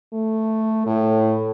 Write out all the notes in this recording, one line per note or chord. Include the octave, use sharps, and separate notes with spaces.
A3
A2